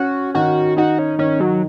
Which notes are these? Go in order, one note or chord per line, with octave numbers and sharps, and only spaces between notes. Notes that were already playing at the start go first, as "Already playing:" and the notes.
Already playing: C#4 F#4
D#3 F#4
D#4 F#4
C#4
D#3 C#4
F#3